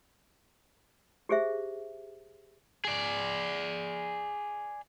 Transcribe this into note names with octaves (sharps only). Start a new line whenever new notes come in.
G4 G#4 C5 E5
G#4 D5